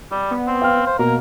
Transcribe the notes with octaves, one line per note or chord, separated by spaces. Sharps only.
G3 D5
B3
C4
F5 G5 F6
C5
B2 A#3 A#4